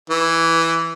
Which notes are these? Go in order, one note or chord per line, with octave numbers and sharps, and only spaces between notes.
E3